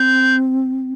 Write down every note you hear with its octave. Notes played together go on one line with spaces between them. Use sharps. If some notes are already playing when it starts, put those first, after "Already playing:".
Already playing: C4 G6